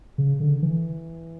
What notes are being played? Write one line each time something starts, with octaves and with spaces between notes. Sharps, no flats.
C#3
D3
E3